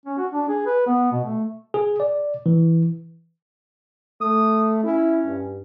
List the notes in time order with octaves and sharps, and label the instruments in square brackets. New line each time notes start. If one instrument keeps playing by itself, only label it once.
[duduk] C#4
F#4
D4
G#4
B4
B3
B2
A3
[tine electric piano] G#4
D5
E3
[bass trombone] A3 [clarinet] D#6
[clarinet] C#4 [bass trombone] E4
[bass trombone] G2